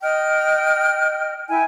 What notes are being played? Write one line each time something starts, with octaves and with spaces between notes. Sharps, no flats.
D#5 G5 F6
E4 E5 G5 G#5